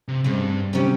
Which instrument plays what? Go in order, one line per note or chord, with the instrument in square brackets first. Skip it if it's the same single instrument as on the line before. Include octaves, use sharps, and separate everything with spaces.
[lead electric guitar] C3
[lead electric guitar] G2 [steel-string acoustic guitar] C#3 G#3 C4
[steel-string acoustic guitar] C3 D#3 G3 C#4 G4